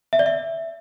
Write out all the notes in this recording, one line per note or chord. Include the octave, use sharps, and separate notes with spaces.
E5
D5
E5